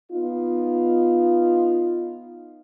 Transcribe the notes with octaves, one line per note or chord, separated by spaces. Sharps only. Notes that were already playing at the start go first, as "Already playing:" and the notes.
B3 D#4 F4